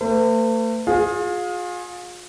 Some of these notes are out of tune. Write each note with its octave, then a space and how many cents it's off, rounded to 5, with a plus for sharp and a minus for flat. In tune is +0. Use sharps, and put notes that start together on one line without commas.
A3 +40 B4 +45
F4 +35 G#4 +0